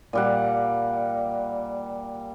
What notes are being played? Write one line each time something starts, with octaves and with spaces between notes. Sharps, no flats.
A#2 G3 F#5